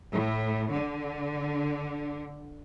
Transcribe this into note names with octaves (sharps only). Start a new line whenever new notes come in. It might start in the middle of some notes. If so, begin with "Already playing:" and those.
A2
D3